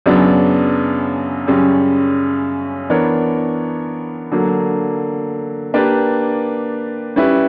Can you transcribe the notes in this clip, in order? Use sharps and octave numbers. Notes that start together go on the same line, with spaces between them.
F#2 C#3 F#3 B3 D4
F#2 C#3 G3 C#4
E3 B3 D4 A#4 C#5
D3 F#3 A#3
A#3 D4 G4 B4 D5
G3 C#4 E4 B4